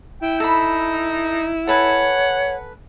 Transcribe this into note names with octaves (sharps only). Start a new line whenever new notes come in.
E4 G5
D#4 A4 B5
A4 B4 C#5 F#5 G#5